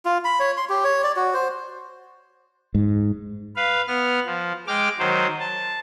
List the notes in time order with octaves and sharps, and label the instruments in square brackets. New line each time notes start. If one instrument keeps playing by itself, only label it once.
[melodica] F4
B5
C#5
C6
G4
C#5
D5
F#4
C5
[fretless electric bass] G#2
[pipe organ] B4 F5
B3 F6
F3
G#3 G5 D6 F6
D#3 F#3 C5
A5